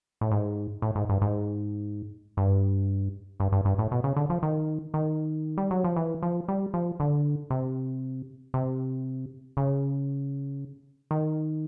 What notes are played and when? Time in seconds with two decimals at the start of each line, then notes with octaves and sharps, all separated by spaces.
0.21 A2
0.31 G#2
0.82 A2
0.96 G#2
1.09 G2
1.22 G#2
2.37 G2
3.40 G2
3.52 G2
3.65 G2
3.78 A2
3.91 B2
4.04 C#3
4.16 D3
4.30 F3
4.43 D#3
4.94 D#3
5.58 G3
5.71 F#3
5.84 F3
5.96 E3
6.23 F3
6.48 G3
6.74 F3
7.00 D3
7.50 C3
8.54 C3
9.57 C#3
11.11 D#3